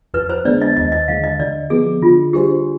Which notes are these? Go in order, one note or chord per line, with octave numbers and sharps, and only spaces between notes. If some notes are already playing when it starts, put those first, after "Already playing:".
F2 B4
C5
D3 G#3 B3 D4 D5
D#5
D#2 D#5
D#5
D3 G#3 F5
D#5
D3 D5
F3 B3 G#4
D3 F4
G3 D4 G4 G#4 C5